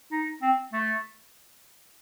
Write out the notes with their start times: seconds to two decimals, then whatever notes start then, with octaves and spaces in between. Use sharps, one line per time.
0.12 D#4
0.42 C4
0.73 A3